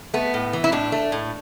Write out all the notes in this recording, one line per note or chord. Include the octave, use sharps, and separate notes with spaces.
A3 B3
A2
E3
E4
A2 D4
A3
A2